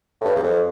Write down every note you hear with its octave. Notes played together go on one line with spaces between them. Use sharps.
A2
G2
E2
F2